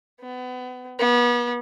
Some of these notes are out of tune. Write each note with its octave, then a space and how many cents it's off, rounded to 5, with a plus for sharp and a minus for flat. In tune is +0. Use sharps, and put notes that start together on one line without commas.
B3 +30
B3 -35